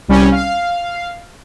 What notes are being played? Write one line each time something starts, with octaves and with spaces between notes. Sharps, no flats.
C2 G3 C#4
F5